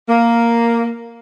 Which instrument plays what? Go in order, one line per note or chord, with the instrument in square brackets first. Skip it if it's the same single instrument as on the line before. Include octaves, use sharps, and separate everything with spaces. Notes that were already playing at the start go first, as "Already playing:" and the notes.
[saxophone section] A#3